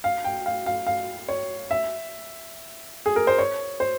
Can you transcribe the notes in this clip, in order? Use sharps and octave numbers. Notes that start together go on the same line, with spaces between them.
F5
G5
F5
F5
F5
C#5
E5
G#4
A#4
C5
C#5
C5